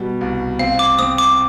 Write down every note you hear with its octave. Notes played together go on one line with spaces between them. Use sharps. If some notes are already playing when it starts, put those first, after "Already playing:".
Already playing: B2 G3
C2
C4 F5
D6
C4 D#6
D6